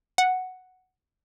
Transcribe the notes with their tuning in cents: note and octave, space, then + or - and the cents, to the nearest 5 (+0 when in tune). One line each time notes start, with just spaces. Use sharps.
F#5 +0